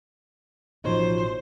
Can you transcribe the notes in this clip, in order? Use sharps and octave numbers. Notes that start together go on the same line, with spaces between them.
A1 B2 F3 D#4 C5 C#5